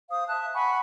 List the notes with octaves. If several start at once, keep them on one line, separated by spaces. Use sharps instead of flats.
C5 F5 D#6
E5 A5 F#6
F#5 G#5 B5 C#6